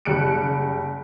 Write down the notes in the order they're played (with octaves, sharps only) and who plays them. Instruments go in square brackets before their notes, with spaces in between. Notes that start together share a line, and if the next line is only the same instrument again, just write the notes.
[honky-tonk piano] F#1 G3 F#6 C#7 D7